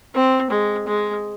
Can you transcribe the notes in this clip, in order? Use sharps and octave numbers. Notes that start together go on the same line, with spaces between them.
C4
G#3
G#3